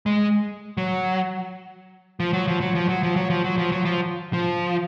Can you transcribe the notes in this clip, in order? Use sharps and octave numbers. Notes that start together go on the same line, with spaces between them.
G#3
F#3
F3
F#3
F3
F#3
F3
F#3
F3
F#3
F3
F#3
F3
F#3
F3
F3